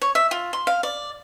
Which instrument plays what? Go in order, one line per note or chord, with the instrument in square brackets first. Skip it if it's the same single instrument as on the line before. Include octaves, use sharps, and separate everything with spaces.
[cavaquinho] C#5
E5
F4
C6
F5
D5